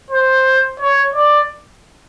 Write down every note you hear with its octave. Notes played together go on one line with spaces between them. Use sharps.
C5
C#5
D5